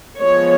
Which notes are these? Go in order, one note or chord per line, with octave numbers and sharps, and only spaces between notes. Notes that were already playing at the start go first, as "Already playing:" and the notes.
F3 G#3 B3 C#5